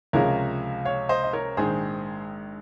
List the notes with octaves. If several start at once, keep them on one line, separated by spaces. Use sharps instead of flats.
C#2 C3 F3 G#3 A#4 C#5
C#5 F5
C5 D#5
D#5
A#4 C#5
A#1 G#2 D#3 G#4 C5